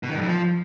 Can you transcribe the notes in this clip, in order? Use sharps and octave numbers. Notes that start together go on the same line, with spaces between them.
B2
D#3
G2
F2
F3